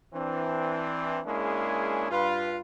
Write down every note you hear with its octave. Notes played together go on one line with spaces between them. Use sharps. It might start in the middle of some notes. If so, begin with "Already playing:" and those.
E3 C4 D4
G#3 A#3 C#4 D4 E4 G#4
G2 F4 B4